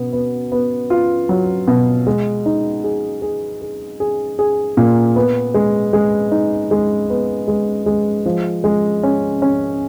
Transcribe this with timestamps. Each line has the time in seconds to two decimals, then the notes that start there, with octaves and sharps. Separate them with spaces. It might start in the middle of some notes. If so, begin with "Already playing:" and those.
Already playing: B2 B3
0.13 B3
0.52 B3
0.90 F4
1.29 F#3
1.68 B2
2.07 G#3
2.46 D#4
2.84 G#4
3.22 G#4
3.62 G#4
4.00 G#4
4.39 G#4
4.77 A#2
5.16 B3
5.54 G#3
5.93 G#3
6.31 D#4
6.71 G#3
7.10 B3
7.48 G#3
7.86 G#3
8.26 F3
8.64 G#3
9.03 C#4
9.42 C#4